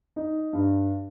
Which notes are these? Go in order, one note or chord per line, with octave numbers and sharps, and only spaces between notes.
D#4
G2